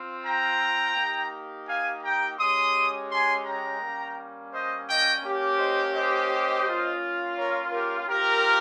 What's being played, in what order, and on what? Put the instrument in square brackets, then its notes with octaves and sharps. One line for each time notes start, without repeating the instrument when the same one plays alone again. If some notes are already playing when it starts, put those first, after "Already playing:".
Already playing: [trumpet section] C4 F4
G5 A#5
A#3 D#4 G4
F5 G#5
G5 A#5
G#3 C#4 G4 C6 D#6
G#5 C6
G5 A#5
G3 A#3 C#4
C5 D#5
D#5 G5
A#3 C#4 G4
C5 D#5
C5 D#5
A#3 C#4 F4
A#4 C#5
G4 A#4
C4 F4 G4 A#4